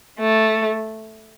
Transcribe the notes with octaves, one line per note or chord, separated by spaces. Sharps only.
A3